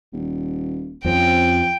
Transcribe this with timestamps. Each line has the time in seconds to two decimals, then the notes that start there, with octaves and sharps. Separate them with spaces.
0.13 D#1
1.05 F2 F3 C4 C#4 G5